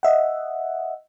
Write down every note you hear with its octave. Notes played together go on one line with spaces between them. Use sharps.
D#5 E5 F#5